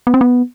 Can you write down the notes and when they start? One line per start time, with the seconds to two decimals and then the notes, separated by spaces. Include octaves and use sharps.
0.07 B3
0.14 C4
0.21 B3